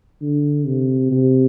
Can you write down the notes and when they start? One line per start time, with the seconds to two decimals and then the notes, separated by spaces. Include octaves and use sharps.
0.22 D3
0.66 C3
1.11 C3